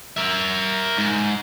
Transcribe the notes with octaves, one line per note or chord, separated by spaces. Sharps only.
A#4 E5
G#2